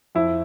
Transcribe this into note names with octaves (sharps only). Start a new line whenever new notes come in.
F2 E4